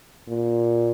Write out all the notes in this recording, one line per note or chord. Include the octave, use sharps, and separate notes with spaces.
A#2